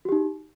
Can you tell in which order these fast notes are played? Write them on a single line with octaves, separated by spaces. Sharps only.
F#4 G4 D#4